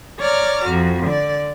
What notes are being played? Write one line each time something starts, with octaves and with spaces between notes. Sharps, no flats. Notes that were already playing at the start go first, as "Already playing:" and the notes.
C#5 D5 A#5 D6 F6
F2 F#4
D3 D5